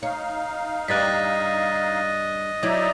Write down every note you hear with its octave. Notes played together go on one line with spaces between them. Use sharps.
D#4 C#5 F5
G2 G4 D5 D#5 F#6 A6 B6
F#3 D#4 E4 D5 E5 D#6